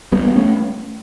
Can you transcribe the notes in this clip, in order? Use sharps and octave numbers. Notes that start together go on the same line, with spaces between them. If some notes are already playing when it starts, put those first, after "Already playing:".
G3 B3
B3
A3 C#4